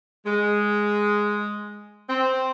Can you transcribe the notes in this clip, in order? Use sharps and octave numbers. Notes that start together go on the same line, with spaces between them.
G#3
C4